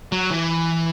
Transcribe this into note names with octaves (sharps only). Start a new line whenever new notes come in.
F#3
E3